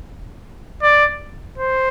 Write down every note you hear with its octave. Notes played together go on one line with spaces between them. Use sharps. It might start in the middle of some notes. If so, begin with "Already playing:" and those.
D5
C5